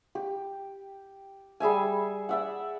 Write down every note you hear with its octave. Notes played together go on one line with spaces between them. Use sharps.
G4
G3 G#4 E5 G#5
D5 E5 F#5